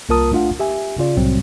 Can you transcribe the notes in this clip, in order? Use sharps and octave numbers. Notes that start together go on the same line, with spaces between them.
C2 A#3 F4 A#4 A5 D#6
A3 D4 F4 F5 F#5
G4 E5 G#5
C#3 F4 D5
C2 A2 C3 F#3 G3 C4